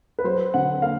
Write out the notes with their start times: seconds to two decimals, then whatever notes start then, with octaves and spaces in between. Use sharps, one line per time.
0.19 B4
0.24 F#3 C5
0.54 D3 F#5
0.82 A#3 F5